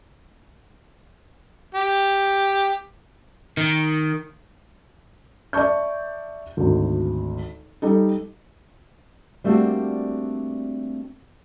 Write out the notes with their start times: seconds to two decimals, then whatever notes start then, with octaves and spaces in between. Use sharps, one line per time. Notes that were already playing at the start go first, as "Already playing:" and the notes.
1.75 G4
3.57 D#3
5.53 D5 E5 A5 C#6 G6
6.57 G#1 D2
7.82 G3 D#4 A4
9.44 G3 A3 A#3 C4 D4 F#4